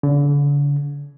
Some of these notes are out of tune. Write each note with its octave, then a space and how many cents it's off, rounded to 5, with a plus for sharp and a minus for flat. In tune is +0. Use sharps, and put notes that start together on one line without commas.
D3 -40